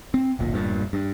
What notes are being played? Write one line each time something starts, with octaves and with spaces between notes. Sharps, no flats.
C4
D1 G1 A#2
E1 G2 A#2
G2